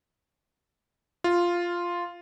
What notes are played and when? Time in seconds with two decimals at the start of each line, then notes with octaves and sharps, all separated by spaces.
1.24 F4